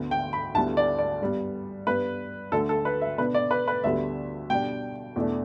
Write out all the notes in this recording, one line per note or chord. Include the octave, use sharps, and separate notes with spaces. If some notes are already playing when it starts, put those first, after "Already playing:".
Already playing: D2 D3 B3
G5
B5
D2 D3 G3 B3 E4 A5
D5
D5
G2 G3 B3
G2 G3 B3 B4
D2 D3 A3 A4
A4
B4
E5
B2 B3 D4 B4
D5
B4
B4
D2 D3 G3 B3 D4 E5
B2 G3 D4 G5
E2 B2 A3 D4